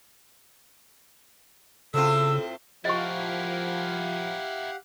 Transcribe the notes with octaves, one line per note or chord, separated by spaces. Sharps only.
A2 C#3 C4 F4 A4 E6
F3 E4 G4 A#4 D#5 F5 F#5 C#6